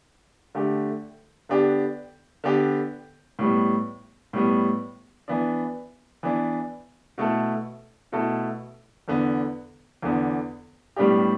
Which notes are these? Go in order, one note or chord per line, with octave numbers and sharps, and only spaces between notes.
D3 A3 G4
D3 B3 D4 G4
D3 B3 D4 G4
A2 G3 B3
A2 G3 B3
E3 B3 D4
E3 B3 D4
B2 A3 E4 A4
B2 A3 E4 A4
E2 D3 B3
E2 D3 B3
A2 G3 B3 D4 G4